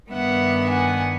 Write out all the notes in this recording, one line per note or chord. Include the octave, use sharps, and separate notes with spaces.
G2 D#3 G3 B3 D4 E5 F#5
F#5 G#5